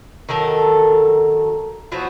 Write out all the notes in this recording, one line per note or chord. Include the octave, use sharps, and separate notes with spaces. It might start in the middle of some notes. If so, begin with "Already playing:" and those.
D#3 F#3 A4 A#4
F3 F#3 B3 F#4